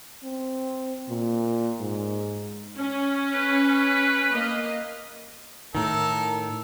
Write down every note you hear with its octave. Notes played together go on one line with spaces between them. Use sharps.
C4
A#2
G#2
C#4
B4
A#3 D#5 F5
A2 D#3 A4 A#4